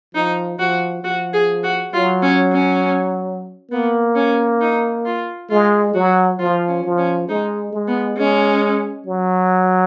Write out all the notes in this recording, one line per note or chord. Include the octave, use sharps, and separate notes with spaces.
F3 D#4
F3 F#4
F3 F#4
G#4
F#4
F#3 F4
C#4
C#4
A#3 B3
C#4
D#4
F4
G#3 F4
F#3 F#4
F3 F4
C#4
F3
C#4
G#3 D#4
G#3
B3
G#3 C#4
F#3